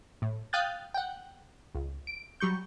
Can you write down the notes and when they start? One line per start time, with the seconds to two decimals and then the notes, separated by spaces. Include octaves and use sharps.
0.22 A2
0.53 F5 G5 D#6 F#6 G6 A6
0.94 F#5 G5
1.75 C#2
2.07 D7
2.40 F#3 G3 C#6 G6